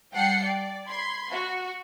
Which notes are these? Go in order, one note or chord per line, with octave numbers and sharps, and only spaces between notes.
G3 F#5 G5 A5 C7 C#7
D5
B5 C6 G#6 C7
F#4